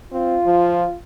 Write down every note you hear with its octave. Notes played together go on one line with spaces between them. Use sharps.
C4 F4
F3